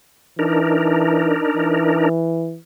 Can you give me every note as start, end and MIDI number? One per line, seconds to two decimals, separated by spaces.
0.39 1.41 52
0.39 2.09 62
0.39 2.09 63
0.39 2.09 70
1.57 2.58 52